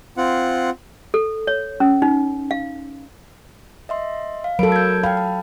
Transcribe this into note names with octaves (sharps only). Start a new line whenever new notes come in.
C4 F4 F#5
A4
C#5
C#4
D#4
F5
D#5 E5 C6
F5
F#3 A4 A#4 B5 D7
G6 G#6
F5 G5 A5 B5
A5